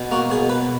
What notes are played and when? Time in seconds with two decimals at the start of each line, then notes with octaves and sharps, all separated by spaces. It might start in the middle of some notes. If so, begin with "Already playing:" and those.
Already playing: B2
0.11 A#3 F#4
0.30 B2 G#4
0.49 B2 B4